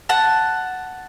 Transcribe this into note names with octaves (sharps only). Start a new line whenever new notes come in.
F#5 A5